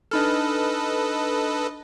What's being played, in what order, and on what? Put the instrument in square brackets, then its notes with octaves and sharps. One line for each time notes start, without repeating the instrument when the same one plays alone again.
[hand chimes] D4 D#4 F6 [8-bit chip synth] A4 B4 D#5